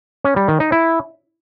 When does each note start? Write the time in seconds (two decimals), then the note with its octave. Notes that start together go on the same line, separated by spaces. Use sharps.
0.24 C#4
0.36 G3
0.48 D#3
0.60 D#4
0.72 E4